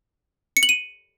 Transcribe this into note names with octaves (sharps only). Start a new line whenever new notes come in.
C#7
F#7
D#7